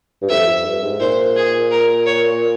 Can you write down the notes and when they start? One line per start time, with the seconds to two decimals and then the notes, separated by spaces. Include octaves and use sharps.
0.22 G2
0.29 F2 E5
0.48 F2
0.65 G2
0.83 G#2
1.00 A#2 C5
1.36 G#4
1.71 A#4
2.06 C#5